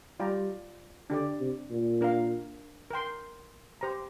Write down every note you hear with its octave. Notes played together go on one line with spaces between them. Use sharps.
G3 F4 D5 G5 A#5
D3 D4 G4 D5
C3
A#2
D4 A#4 F5
A#4 G5 C6
G4 C5 A#5